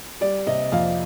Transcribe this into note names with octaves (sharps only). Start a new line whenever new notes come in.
G3 D5
C3 D#5
F2 F5